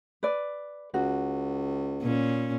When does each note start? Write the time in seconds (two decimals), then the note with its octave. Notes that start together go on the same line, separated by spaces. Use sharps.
0.23 B4 D5
0.94 C#2 F#4
2.02 A#2 C#4